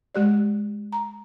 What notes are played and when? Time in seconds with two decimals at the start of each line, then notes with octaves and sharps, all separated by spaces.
0.15 G#3 G4 D5
0.92 A#5